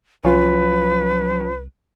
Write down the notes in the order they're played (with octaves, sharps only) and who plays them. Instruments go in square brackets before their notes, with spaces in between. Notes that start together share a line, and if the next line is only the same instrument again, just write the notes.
[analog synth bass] C2 [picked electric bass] F3 F#3 [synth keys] C#4 F4 [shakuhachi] B4